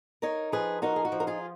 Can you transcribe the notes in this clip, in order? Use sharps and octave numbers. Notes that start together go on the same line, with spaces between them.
D#4 A#4 C#5
F3 G#4 B4
D#4 F#4 A#4
G#4
F#4
F3
A#4
F4 G#4